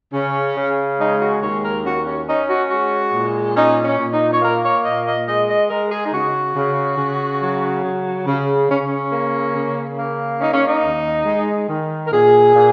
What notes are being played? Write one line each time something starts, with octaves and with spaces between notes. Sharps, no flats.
C#3 C#4
C#3
G#3 D#4
F#4
D#2 C#5
A#4
C#4 F#4
C#4
C#4 D#4
F#4
G#3 F#4
A#2
C#4 D#4
C#4
A#2
D#4
C#5
A#3 A#4
C#5
A#2 D#5
D#5
G#3 D#5
D#5
G#3 A#4
G#4
D#4
C#3 F#4
C#3
C#3
F#3
C#3
C#3
C#3 C#4
C#4
A#3
C#3
A#3
C#4 D#4
C#4
D#4
D#2
G#3
D#3
A#4
A#2 G#4
A#2